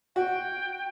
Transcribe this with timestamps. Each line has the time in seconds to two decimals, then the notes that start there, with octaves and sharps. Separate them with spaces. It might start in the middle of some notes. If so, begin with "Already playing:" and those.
0.16 F#4 G5